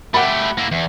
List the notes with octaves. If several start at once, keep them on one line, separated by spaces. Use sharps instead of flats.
A3 G4 F#5 B5
A#3 E4
E2